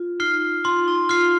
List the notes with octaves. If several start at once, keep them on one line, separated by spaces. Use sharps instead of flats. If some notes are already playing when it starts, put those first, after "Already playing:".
Already playing: F4
D#4 F6 C7
F4 C6
D#4
F4 F6 C7